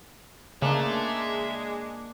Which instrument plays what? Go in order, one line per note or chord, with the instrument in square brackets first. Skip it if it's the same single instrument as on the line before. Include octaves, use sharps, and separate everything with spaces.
[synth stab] C#3 [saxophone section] G#3 [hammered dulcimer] A#3 D4 [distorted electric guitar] E5 A5